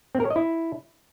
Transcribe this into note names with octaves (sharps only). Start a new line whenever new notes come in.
C4
A#4
C#5
D#5
E4